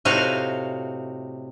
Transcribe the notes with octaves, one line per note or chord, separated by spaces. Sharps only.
A2 C3 D#4 F#4 F5